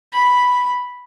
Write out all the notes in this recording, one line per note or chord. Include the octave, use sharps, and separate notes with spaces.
B5